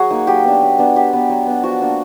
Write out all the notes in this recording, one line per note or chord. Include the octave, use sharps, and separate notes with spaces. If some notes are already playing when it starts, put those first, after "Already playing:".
Already playing: F#3 F#4 G#4
A#3 D#4
F#3 G4
B3 D4
F#3
B3 D4
F#3 G4
B3 D4
F#3
B3 D4
F3 F#4
A#3 D4